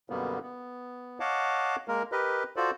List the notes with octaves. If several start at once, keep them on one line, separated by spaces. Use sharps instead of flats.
F#2 B2 D3 G3 A#3 B3
B3
C#5 D#5 F5 F#5 A5 D6
G#3 A#3 A#4
G4 A#4 B4 D#5
F4 F#4 A4 C5 D5